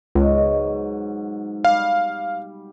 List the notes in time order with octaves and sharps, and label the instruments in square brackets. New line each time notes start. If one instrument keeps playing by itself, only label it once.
[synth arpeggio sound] C#2 [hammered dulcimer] G#2 B2 F#3
[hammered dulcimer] G3 [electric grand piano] F5